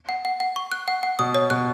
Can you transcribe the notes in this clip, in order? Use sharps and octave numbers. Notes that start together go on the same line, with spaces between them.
F#5
F#5
F#5
C#6
F#6
F#5
F#5
B2 D#6
C#5
B2 F#6